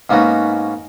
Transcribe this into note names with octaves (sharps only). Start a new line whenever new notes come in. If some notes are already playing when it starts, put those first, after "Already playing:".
G#2 A#3 B3 C#4 D#4 F#4